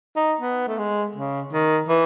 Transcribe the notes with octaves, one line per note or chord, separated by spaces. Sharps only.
D#4
B3
A3
G#3
C#3
D#3
E3